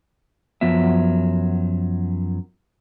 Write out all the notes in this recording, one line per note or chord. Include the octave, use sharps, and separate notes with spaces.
F#2 F3 F#3 B3 E5